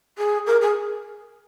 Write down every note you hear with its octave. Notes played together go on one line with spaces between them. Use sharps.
G#4
A#4
G#4